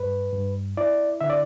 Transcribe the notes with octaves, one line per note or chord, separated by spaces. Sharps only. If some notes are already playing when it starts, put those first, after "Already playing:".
Already playing: G2 B4
G2
E4 D5
D3 E5
D5